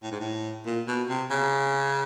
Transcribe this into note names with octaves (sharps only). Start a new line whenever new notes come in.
A2
G#2
A2
A#2
B2
C3
C#3